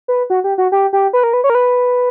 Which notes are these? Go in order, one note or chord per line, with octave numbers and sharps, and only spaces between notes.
B4
F#4
G4
F#4
G4
G4
B4
A#4
B4
C#5
A#4
B4